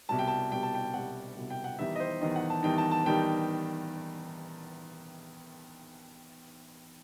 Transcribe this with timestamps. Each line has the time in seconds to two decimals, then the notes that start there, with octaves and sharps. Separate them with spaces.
0.09 C2 B2 G3 A5
0.19 G5
0.28 A5
0.52 C2 B2 G3 G5
0.63 A5
0.75 G5
0.94 C2 B2 G3 F#5
1.36 C2 B2 G3
1.50 G5
1.64 F#5
1.79 E2 D#3 G3 D#4 E5
1.96 D#5
2.00 C5
2.21 E2 D#3 G3 D#4 D#5
2.36 F#5
2.50 A5
2.63 E2 D#3 G3 D#4 G5
2.78 A5
2.91 A5
3.05 E2 D#3 G3 D#4 G5